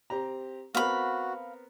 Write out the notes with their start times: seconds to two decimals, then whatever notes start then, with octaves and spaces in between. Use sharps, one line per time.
0.10 C4 G4 A#5
0.75 B3 C4 F#4 A#4 F5 B5